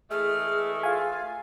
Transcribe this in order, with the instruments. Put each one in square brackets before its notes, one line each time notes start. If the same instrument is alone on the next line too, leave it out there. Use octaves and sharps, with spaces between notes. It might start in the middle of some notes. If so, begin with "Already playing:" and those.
[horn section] E3 G#3 A3 [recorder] G#4 [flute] F6
[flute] F4 [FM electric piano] F5 G#5